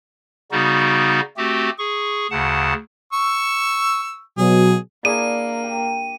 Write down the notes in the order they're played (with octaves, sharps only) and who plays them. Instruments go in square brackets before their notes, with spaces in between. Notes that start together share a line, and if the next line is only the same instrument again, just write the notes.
[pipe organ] C#3 G3 B3 D#4 F#4
A3 C4 F#4 G4
G#4 C#6
D2 C#3 F#5 A5
[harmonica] C#6 E6
[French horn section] B2 F#3 [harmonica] G#4
[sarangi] A#3 [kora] D4 E4 G#4 [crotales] D#7
[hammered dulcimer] G4